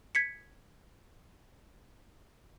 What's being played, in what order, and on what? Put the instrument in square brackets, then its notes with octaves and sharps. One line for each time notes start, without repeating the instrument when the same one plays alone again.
[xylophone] G#6 B6 C#7